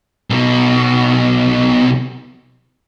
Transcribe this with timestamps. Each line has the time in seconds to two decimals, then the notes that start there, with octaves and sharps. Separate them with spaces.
0.30 B1 B2